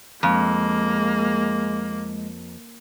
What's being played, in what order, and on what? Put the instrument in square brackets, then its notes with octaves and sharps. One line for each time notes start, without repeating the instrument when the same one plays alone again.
[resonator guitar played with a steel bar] F2 [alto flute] G#3 [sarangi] A#3